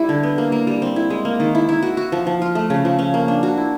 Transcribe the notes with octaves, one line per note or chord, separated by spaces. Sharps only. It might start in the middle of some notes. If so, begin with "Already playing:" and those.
Already playing: G3 E4
D3
B3
A#3
A#3
G3
C4
E4
G#3
A#3
D#3
E4
E4
F#4
F#4
F3
F3
F4
A3
C#3
F3
C#4
A#3
D4
F#4
E4